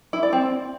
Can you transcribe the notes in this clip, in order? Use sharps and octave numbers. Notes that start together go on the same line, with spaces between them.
E4
D5
C4